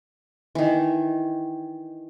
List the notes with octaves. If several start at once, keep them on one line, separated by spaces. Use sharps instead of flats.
D#3 E3